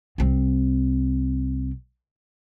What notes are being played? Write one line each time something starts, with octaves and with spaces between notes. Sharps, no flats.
C2 C4